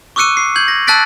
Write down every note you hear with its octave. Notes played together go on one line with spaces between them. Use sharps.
C#6 D6 E6 F#6 C#7 D#7
C7
G6 G#6 F#7
A#6
A5 E6 F#6 A6 B6 D7